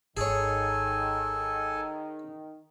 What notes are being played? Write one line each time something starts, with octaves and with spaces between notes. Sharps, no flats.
G#1 D#3 G#4 A4 C#5 G#5